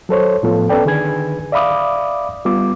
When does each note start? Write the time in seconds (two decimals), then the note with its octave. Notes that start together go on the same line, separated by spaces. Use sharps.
0.09 F#3 A4 C5 C#5
0.43 A2 F3 B3 F4 A4
0.69 B3 C#4 A4 B4 D5 G5
0.86 D3 D#3 G#4 B4 G#5 G#6
1.52 D5 E5 F5 B5 D6 D#6
2.45 G3 B3 F4 D6